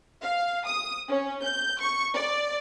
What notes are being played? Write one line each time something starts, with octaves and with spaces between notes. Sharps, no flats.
F5
D#6
C#4
G6
C#6
D5